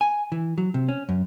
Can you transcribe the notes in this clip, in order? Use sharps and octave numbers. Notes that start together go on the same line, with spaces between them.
G#5
E3
F#3
C3
C#4
F#2